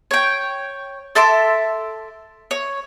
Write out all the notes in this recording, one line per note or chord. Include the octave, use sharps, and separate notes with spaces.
C#5 G5
A4 E5 C6 D6
C#5